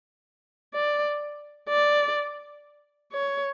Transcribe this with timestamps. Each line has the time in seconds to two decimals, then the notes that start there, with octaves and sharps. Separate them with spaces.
0.74 D5
1.69 D5
3.12 C#5